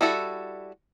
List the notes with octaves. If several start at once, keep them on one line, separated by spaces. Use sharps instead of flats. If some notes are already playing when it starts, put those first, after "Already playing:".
G3 E4 F#4 A4